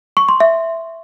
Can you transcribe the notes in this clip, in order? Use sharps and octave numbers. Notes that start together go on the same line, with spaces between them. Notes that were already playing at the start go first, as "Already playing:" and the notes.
C#6
C6
E5